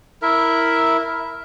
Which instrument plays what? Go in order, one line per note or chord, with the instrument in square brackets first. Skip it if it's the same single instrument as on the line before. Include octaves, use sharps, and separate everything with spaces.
[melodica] E4 A#4 E5